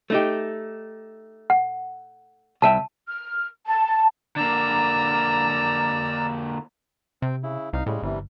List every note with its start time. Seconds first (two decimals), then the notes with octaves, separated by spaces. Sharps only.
0.10 A3 D#4 G4
1.50 F#5
2.62 C2 E5 G5 A5
3.07 F6
3.66 A5
4.36 D3 A#3 D5 A#5 E6
7.22 C3 C4 G5
7.43 C#3 E4
7.73 C2 D#4 F5
7.86 A2 C#3 G3 G#3
8.03 G1 C3 E3 G3